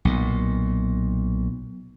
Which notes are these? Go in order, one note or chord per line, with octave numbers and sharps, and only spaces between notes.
B1 A#2